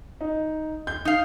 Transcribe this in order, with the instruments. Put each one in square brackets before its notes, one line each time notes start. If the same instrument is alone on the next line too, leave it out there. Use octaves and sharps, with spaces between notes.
[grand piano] D#4
G6
[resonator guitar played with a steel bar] D#4 F5